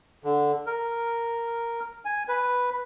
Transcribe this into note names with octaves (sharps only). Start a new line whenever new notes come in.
D3
A#4
G#5
B4